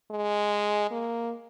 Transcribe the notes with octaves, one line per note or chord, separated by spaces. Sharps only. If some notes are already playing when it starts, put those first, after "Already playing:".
G#3
A#3